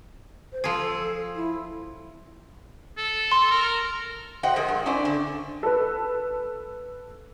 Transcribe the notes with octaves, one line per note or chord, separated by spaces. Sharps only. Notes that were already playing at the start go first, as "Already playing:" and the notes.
C5
F3 G#4 A4
E4
A4
C6
A#4
F#4 C5 D#5 F#5 G5
F3 G#3 G#4 A#4
G2
C#4 D4 E4 C5
D3
A4 B4